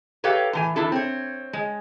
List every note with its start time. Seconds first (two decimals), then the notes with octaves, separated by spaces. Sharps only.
0.24 G4 A4 B4 C#5 F5 G5
0.53 A2 E3 G#5
0.76 E2 D4 E4 A4
0.92 C4 C#5
1.53 G#3